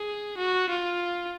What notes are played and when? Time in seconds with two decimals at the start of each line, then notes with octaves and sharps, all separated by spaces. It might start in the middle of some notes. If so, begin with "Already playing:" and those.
Already playing: G#4
0.38 F#4
0.70 F4